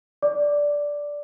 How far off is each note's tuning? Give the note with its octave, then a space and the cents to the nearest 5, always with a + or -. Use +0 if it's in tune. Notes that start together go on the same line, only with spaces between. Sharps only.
D5 -10 D6 +0